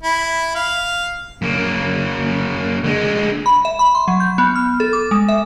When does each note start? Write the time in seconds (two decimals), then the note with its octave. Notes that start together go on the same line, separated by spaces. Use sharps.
0.03 E4
0.55 F5
1.42 F#2 A#3
2.84 D3 G#3
3.46 B5
3.65 E5
3.79 B5
3.95 C6
4.08 F#3
4.20 G6
4.38 B3
4.56 F6
4.80 A4
4.93 D6
5.11 G#3
5.28 E5